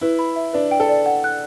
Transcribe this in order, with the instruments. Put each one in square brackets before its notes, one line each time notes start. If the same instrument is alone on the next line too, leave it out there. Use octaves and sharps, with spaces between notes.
[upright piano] E4 [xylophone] B4
[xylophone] B5
E5
[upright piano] D4 [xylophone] B4
[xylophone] G5
[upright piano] A4
[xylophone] D5
F#5
F#6